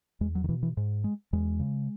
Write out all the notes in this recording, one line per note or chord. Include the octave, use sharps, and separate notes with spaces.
E2 G#3
F#3
D#3
B2 E3
E3
G#2
G#3
E2 G#3
C#3